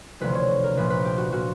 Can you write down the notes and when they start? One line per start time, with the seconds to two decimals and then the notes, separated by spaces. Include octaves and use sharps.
0.20 E1 D2 C3 F3 B4
0.35 C#5
0.64 A#4
0.77 A#1 A#2 F3 B4
0.90 B4
1.05 G4
1.18 F#4
1.33 A#2 F3 F#4